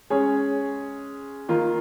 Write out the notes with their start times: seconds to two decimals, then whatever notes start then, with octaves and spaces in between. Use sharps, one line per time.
0.10 G#3 C#4 G#4 C#5
1.49 D#3 A#3 F4